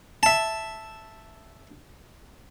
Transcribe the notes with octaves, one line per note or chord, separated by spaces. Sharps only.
E5 A5